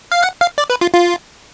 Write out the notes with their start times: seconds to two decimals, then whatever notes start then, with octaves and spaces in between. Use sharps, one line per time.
0.12 F5
0.23 F#5
0.41 F5
0.58 D5
0.70 B4
0.81 F4
0.93 F4